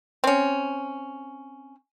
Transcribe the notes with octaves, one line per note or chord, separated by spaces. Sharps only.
C4 C#4